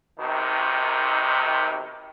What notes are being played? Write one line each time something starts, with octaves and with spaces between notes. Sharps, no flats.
B1 C3 D#3